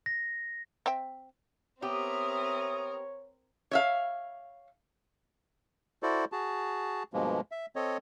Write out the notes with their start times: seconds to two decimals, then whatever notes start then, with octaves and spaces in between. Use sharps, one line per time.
0.06 A#6
0.86 C4 E5 G5
1.82 B3 C4 G4 A#4 C#5 E5 D#6
3.71 C#5 E5 F5
6.03 E4 F#4 A4 C5 D5
6.32 F#4 G#4 A5
7.13 G2 B2 F3 G#3 A#3
7.51 E5
7.76 C4 A4 C#5 D#5